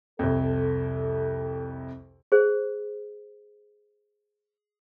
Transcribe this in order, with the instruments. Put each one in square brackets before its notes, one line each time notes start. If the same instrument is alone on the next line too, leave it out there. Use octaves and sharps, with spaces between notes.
[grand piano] C2 F2 [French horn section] A4
[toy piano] G#4 C5